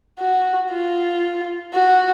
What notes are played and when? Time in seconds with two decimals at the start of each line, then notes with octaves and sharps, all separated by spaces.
0.19 F#4
0.71 F4
1.74 F#4